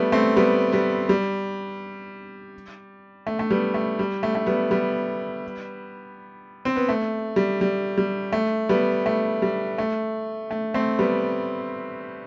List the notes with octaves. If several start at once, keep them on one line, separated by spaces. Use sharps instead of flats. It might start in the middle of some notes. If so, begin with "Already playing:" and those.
Already playing: G3 A3 B3
A3 C4
G3 B3
G3 B3
G3
A3
A3
G3 B3
A3
G3
A3
A3
G3 B3
G3 B3
C4
B3
A3
G3
G3
G3
A3
G3 B3
A3
G3
A3
A3
A3 C4
G3 B3